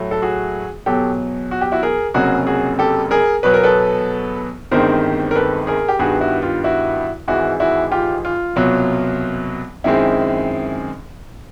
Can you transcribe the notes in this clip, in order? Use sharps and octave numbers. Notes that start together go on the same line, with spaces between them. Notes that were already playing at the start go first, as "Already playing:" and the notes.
Already playing: A2 F#3 A3
A4
F#4 G#4
E2 B2 F#3 G4 A4
F#4
G4
E4 F#4
G#4 A#4
F1 F2 C#3 F#3 A#3 F#4 G#4
F#4 G#4
G4 A4
G#4 A#4
E2 B2 F#3 B3 B4
A#4
A4 B4
G1 G2 D#3 G#3 C4 A#4 C5
A#4
A4 B4
G#4 A#4
G4
G2 D#3 G3 B3 F#4 G#4
E4 F#4
F4
E4 F#4
G#1 G#2 E3 E4 F#4
E4 F#4
F4 G4
F4
C2 B2 F#3
F#2 D#3 G#3 C4 E4